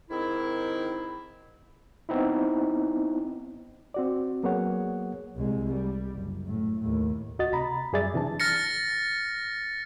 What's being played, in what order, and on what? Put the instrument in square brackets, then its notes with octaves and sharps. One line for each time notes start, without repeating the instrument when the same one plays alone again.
[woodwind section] G#2 D#3 C4 E4
[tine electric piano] B3 C4 D#4 E4
[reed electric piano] C4 F#4 D5
F#3 A#3 B3 G#4 C#5 F#5
[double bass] C2 G#3
G3
F#1
A2
D#2 A2
[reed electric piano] C#2 F#4 D#5 A6
C3 A#5 B5
F#2 G3 G#4 D5 E5 A6
C3 E3 D4 A5
[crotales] F6 A6 A#6 C#7